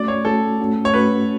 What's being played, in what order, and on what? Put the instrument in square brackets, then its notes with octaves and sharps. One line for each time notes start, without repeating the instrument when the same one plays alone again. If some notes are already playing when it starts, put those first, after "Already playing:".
Already playing: [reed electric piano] A3 C#4 F#4 [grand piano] D5
[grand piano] C#5
[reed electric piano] A3 C#4 F#4 [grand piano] A4
[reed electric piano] A3 C#4 F#4
[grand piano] C#5
[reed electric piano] A3 C#4 F#4 [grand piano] B4